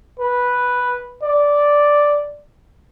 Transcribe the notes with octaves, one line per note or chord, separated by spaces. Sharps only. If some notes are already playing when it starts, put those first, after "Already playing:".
B4
D5